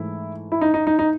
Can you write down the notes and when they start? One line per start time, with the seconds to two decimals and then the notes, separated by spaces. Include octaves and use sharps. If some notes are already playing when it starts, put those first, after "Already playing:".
Already playing: G#2 E3 A3 E4
0.52 E4
0.61 D#4
0.74 D#4
0.87 D#4
0.99 D#4